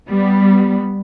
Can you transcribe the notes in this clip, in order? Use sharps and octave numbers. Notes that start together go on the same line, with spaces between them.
G3 B3